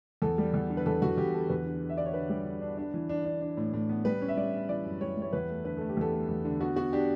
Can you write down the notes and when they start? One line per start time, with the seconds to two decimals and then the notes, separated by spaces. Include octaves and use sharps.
0.22 E2 A4
0.38 G3
0.54 E2
0.70 D3
0.77 B4
0.86 E2 A4
1.02 E2 F#4
1.17 E2 G4
1.33 D3 A4
1.50 E2 B4
1.66 D3
1.81 D3
1.89 E5
1.97 D3 D5
2.06 C#5
2.13 D3 B4
2.29 G3
2.46 D3
2.61 D4
2.77 D4
2.94 E3
3.09 D4
3.25 D4
3.41 D4
3.57 A2
3.73 A2
3.89 B3
4.05 G3 B4
4.21 C#4
4.28 E5
4.37 G3 D5
4.53 C#4
4.69 E3 D5
4.85 F#2
5.01 G3 C#5
5.17 G3 C#5
5.33 E2 B4
5.49 A3
5.65 D3 B4
5.77 A3 A4
5.89 G4
5.97 E2 A4
6.13 A3
6.29 E2
6.45 D3
6.61 B3 F#4
6.76 B3 F#4
6.93 D4 G4